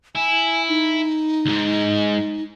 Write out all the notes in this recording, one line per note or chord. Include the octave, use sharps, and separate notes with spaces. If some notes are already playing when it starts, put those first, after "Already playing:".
E4 G#5
D#4
D2 G#2